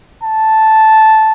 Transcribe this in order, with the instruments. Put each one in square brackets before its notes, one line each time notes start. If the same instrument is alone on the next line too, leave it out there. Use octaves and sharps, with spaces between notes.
[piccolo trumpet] A5